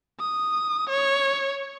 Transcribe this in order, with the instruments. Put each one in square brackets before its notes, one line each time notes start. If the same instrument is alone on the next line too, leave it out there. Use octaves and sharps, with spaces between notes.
[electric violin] D#6
C#5